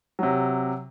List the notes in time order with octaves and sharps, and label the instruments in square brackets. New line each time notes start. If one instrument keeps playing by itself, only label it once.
[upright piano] C3 F#3